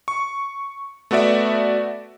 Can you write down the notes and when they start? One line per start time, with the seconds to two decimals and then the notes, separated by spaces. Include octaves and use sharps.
0.08 C#6
1.11 A3 B3 F#4 D5 E5